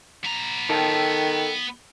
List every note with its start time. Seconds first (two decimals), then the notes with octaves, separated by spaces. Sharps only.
0.24 B3 A#5
0.69 D#3 A4 G5 A5